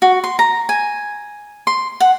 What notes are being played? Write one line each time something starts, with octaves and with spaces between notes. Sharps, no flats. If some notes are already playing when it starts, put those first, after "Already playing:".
F#4
C6
A#5
G#5
C6
F#5